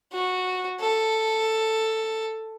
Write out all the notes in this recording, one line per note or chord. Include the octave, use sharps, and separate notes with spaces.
F#4
A4